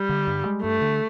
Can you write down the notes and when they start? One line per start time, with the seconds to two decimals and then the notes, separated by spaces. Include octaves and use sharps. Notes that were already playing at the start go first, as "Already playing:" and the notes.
Already playing: G3
0.09 D3
0.28 G2
0.46 G#3
0.63 G2 A3
0.82 D3